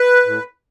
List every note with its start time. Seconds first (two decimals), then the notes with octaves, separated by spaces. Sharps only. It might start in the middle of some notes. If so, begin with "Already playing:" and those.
Already playing: B4
0.26 A2